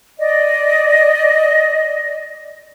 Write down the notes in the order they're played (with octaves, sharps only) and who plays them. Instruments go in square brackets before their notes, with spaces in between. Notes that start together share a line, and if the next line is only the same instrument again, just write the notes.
[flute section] D5 D#5